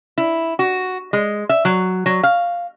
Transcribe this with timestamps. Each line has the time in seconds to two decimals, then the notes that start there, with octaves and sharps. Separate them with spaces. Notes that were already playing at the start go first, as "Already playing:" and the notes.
0.18 E4
0.59 F#4
1.13 G#3
1.49 E5
1.65 F#3
2.06 F#3
2.23 F5